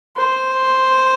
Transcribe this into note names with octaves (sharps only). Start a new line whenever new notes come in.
C5